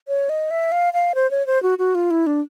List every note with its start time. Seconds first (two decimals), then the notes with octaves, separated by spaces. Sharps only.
0.08 C#5
0.29 D#5
0.51 E5
0.72 F5
0.93 F5
1.15 C5
1.31 C#5
1.47 C5
1.63 F#4
1.79 F#4
1.95 F4
2.11 E4
2.27 D4